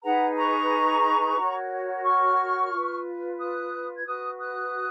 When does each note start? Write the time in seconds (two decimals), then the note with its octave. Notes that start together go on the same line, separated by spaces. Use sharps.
0.03 D#4 G#4 B4 F#5 A#5
0.36 A#5 C#6
1.37 F#4 A#4 C#5
2.04 C#6 F6
2.71 F4 B4
3.39 D#6 F#6
3.95 G#6
4.06 F#4 B4 D#6 F#6
4.39 D#6 F#6